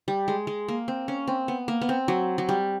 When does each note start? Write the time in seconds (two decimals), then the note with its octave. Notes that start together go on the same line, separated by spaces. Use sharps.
0.08 G3
0.28 G#3
0.47 G#3
0.68 A#3
0.88 C4
1.08 C#4
1.28 C4
1.48 B3
1.68 A#3
1.81 B3
1.89 C4
2.08 F#3
2.38 F#3
2.49 G3